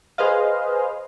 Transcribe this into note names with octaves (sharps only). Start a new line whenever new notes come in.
G#4 B4 C5 D#5 F5